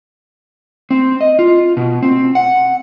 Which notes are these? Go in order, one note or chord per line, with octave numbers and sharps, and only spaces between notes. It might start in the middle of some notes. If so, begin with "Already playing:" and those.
C4
D#5
F4
B2
C4
F#5